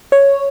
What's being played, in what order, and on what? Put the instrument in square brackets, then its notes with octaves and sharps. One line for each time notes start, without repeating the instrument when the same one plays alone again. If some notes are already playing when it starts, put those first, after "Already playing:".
[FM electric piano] C#5